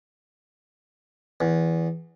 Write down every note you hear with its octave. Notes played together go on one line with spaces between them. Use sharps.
E2